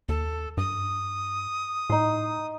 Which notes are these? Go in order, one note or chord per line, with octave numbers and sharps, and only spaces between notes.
D#2 A4
G2 D#6
A2 D#4 C6